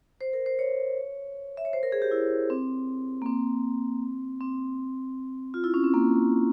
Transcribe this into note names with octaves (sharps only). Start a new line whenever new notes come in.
C5
A#4
C5
C#5
E5
C#5
C5
A#4
G#4
G4
E4
C4
A#3
C4
C4
F4
E4
C#4
C4
A#3